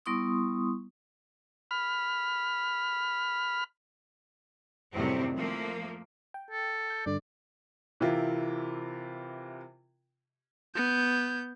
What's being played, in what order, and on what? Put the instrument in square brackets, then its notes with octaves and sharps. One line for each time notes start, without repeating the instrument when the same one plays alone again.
[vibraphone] G3 B3 E4 C6 C#6 D#6
[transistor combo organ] B5 F6
[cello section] F#2 A2 C3 D#3 G3 C4
F3 A3 A#3
[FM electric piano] G5
[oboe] A4
[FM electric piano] G6
[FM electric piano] G2 D3 [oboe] D5
[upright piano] C3 E3 C4 E4 F4 A#4
[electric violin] B3 G6